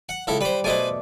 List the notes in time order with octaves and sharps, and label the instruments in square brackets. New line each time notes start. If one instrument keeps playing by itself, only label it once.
[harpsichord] F#5
C#2 E4 A4
[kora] G3 [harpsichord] B4 C5
[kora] B2 A3 D5 [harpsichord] B4 C5 G#5